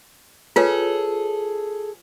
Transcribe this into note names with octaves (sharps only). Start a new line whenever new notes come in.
F4 G#4 A4 B4 C#5